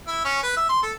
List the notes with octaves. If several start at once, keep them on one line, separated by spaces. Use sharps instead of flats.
E4
C#4
B4
E5
C6
A4